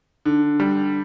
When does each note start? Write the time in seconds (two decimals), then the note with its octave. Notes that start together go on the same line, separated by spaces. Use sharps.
0.25 D3
0.60 G3